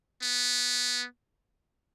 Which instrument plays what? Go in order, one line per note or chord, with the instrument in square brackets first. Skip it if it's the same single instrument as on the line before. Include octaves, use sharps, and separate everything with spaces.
[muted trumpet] B3